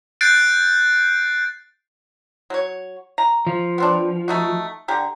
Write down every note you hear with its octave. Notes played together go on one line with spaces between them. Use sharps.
F#6 G6 A6 C7 D7
F#3 C#5
A#5
F3
B3 C4 D4
A3 D#4 F#4
D3 G4 A#5